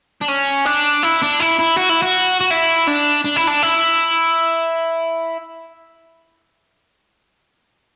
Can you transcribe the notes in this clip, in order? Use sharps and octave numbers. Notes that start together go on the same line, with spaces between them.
D4
C#4
D4
E4
D4
E4
E4
F#4
E4
F#4
F#4
E4
D4
D4
E4
D4
E4